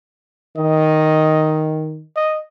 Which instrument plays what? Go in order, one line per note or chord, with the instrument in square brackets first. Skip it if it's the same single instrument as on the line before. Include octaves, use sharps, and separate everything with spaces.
[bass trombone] D#3 [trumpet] D#5
[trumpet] D#5